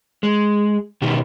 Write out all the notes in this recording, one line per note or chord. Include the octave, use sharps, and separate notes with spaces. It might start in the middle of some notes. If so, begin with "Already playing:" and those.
G#3
B2 D#3 G4